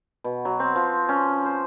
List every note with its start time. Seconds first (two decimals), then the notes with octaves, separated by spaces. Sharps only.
0.24 B2
0.45 F#3
0.60 C4
0.76 F3
1.09 C#4
1.45 C5